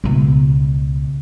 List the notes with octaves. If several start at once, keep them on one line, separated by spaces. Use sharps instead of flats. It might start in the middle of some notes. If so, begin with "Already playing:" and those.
C#2 B2